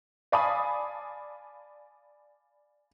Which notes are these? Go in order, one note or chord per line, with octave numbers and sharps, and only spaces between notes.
D5 F5 G#5 A5 B5 D#6